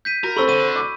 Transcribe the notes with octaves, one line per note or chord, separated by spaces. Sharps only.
G6 B6 D#7
F#4 A#4
C4 A4 B5 C#6 E6
D3 D#7
D6